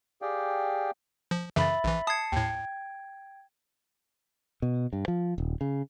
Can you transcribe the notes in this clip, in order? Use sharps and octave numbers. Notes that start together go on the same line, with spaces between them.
G4 G#4 D5 F5 G5
F3
F#2 C#3 E3 E5 B5 A6
A#1 E3
A5 D#6 G#6 C7 C#7
D#2 A2 G5 G#6
B2
G2
F3
D#1
C#3